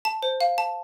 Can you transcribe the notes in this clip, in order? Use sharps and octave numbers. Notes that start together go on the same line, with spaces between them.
A5
C5
F5
A5